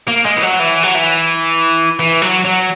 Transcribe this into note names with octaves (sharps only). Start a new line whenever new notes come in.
A#3
G#3
E3
F#3
E3
F#3
E3
E3
F#3
F#3